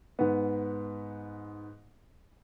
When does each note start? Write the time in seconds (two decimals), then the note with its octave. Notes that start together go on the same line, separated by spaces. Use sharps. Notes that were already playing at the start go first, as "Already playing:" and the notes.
0.19 G#2 B3